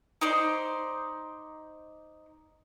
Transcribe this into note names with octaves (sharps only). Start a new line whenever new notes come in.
D#4 C5 D5 C6